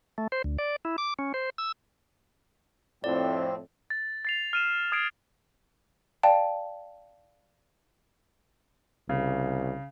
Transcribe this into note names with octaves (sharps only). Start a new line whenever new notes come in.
A3
C5
D2
D5
E4
D6
C#4
C5
E6
F2 A2 C4 D5
A6
A6 C7 F7
F6 D#7 E7
D#6 G#6 C7 D7
D5 F5 G5 A5
C2 C#3